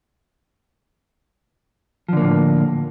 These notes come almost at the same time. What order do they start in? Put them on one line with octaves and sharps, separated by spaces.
F3 D3 A#3 A2